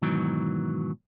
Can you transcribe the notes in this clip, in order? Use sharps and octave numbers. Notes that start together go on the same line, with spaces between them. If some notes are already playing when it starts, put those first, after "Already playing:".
G#2 B2 D#3 E3 F#3